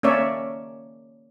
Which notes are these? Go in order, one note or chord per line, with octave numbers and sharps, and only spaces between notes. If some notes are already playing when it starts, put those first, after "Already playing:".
A#3 C#4 A#4 C#5 D5 E5